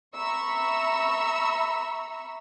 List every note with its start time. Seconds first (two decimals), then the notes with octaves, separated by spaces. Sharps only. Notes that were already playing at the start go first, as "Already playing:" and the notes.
0.16 E5 A#5 B5 C#6 E6